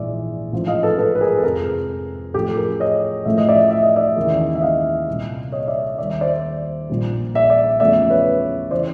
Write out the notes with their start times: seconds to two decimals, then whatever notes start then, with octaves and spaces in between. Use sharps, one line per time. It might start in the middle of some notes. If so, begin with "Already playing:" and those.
Already playing: A#1 G#2 E3 G#3 D5 E5
0.52 A1 G#2 F3
0.67 D#5 F5
0.83 A4 B4
0.98 A4 B4
1.15 B4
1.21 G#4 A#4
1.38 A4
1.43 F2 C3 F3 G#3 G#4 A#4
2.34 A1 A2 F3 G4 A4
2.49 A4
2.57 G#4 A#4
2.80 C#5 D#5
3.25 A1 A2 F3 A3 E5
3.38 D#5
3.49 D5 E5
3.71 E5
3.83 D#5
3.96 D5 E5
4.16 D#2 C#3 E3 G#3
4.55 E5
4.61 D#5 F5
5.08 C2 A#2 G3
5.52 C#5 D#5
5.68 D5 E5
5.98 D#2 D#3 G3 D5 E5
6.21 C5 D5
6.89 A#1 A#2 G3
7.35 D5 E5
7.50 D5 E5
7.80 E2 C#3 F3 A3 D5 E5
8.10 B4 C#5
8.71 C#3 E3 C5 D5